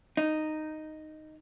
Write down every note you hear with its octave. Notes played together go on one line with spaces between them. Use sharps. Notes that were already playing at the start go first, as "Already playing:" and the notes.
D#4